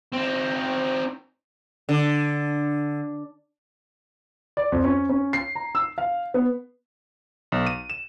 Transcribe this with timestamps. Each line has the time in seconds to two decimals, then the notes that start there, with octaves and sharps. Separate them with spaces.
0.12 C4 D#4
1.89 D3
4.57 D5
4.72 F2
4.84 C#4
5.09 C#4
5.33 C7
5.55 A#5
5.75 E6
5.98 F5
6.34 B3
7.52 B1
7.67 D#7
7.90 E7